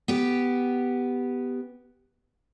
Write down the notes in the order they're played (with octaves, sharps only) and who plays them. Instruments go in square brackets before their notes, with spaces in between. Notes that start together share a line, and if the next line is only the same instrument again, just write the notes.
[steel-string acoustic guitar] B3 G4